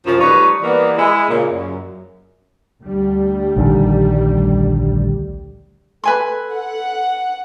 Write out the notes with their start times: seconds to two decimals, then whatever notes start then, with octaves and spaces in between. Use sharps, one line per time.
0.06 F#2 C3 F3
0.20 G3 A3 D#4 B4 C#5
0.62 E3 G3 A#3 B3
0.97 G#3 E4
1.29 A#2 C#3
1.52 F#2
2.82 D2 G3
3.57 A#1 D3 D#3
6.04 A4 B4 G#5 C6
6.53 F#5